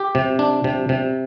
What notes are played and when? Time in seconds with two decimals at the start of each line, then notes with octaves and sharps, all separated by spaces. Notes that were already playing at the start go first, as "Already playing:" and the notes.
Already playing: G4
0.15 C3
0.39 D4
0.64 C3
0.89 C3